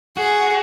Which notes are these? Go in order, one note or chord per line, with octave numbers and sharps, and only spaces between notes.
F#4 G#4